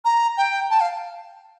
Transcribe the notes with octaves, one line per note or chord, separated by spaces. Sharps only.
A#5
G5
A5
F5